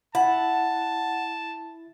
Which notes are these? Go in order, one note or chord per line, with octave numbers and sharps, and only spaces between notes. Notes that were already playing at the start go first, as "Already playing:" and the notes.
E4 F#5 A5